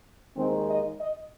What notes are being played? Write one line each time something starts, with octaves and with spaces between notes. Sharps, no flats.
D#2 D#3 G#3 C4
D#5
D#5